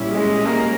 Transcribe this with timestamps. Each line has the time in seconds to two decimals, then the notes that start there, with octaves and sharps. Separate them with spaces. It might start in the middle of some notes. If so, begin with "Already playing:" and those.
Already playing: A#2 G3 C#4 E4 G4
0.11 G#3
0.45 G3 A#3 C#4